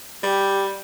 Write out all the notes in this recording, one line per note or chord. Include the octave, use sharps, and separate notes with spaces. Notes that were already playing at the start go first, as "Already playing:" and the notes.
G3 G4